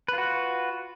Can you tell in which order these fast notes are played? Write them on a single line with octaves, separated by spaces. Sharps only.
B4 F4 F#4